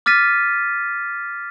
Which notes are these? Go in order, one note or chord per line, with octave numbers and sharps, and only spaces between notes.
D6 F6 A6 B6 D#7